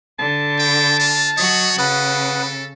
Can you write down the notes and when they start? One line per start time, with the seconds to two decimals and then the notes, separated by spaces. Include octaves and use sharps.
0.19 D3 A5
0.59 G5
1.00 F4
1.37 F#3 F#4 C#5 D#5
1.78 C#3 A4 B4 F#5 D#6